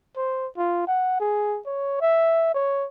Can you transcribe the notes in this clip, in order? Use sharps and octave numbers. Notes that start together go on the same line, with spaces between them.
C5
F4
F#5
G#4
C#5
E5
C#5